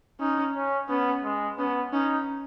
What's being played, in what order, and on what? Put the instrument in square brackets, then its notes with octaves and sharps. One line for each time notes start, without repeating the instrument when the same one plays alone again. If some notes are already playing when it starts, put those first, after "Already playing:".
[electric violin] C#4 [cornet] D#4
[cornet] C#4
[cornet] B3 [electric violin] C#4
[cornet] G#3
[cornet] B3 [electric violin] C#4
[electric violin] C#4 [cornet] D#4